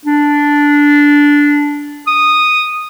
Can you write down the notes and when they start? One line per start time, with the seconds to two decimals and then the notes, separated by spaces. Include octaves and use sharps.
0.05 D4
2.07 D#6